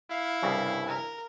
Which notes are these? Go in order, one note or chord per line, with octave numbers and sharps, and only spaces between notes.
E4 F5
C2 G2 C#3
A#4